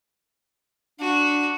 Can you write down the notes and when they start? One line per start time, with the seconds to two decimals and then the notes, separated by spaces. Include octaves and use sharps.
1.00 D4 F#4